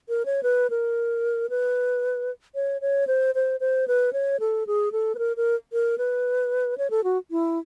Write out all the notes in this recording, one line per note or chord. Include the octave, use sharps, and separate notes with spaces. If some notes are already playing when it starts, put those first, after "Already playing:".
A#4
C#5
B4
A#4
B4
C#5
C#5
C5
C5
C5
B4
C#5
A4
G#4
A4
B4
A#4
A#4
A#4
B4
C#5
A4
F#4
E4